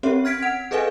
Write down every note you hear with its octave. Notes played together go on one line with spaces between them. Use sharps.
C4 C#4 G4 C#5 E5
F6 G#6 B6 D7
F#5
G#4 A4 B4 D#5 F5 G#5